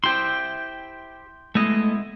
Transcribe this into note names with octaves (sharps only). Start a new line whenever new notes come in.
E4 G4 C5 G5 C6
G#3 A3 B3 E4 D#5